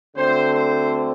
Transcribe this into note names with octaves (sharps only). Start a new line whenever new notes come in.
D2 D3 A3 C4 C5
C5